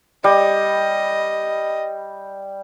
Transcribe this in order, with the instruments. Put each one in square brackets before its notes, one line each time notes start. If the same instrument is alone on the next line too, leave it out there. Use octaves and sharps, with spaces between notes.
[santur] G3 [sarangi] D#5